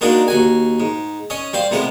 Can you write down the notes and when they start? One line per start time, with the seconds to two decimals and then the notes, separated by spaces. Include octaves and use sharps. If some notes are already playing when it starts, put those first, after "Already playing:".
0.01 G#3 A#3 D4 D#4 F#4
0.28 D#2 F#4 G#5
0.80 G#2
1.30 C#4 D#5
1.53 G3 C5 F5
1.71 A2 C3 G#3 B3